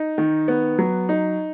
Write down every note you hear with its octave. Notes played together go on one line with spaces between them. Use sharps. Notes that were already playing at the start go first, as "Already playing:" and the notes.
Already playing: D#4
D#3
B3
F#3
D#4